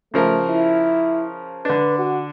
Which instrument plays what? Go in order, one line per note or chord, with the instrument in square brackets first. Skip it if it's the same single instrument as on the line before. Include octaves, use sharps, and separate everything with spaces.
[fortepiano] C#3 F3 A#4 [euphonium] A3
[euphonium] E4
[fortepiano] D3 D4 [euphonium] B4
[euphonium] F#4